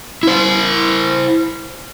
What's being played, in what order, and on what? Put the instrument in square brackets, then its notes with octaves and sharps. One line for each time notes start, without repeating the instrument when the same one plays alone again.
[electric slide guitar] E4 C5